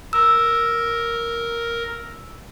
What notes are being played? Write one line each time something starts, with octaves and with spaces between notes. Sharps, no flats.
A#4 E6